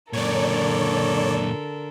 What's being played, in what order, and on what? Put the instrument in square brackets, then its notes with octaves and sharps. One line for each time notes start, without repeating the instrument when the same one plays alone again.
[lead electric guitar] F#2 A#2 [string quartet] D3 A4 A#4 [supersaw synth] C#5 D5